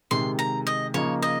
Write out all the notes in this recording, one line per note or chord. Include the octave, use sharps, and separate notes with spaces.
C3 D#3 G#3 C6
A#5
D#5
C#3 F3 A#3 D#4 C#5
D#5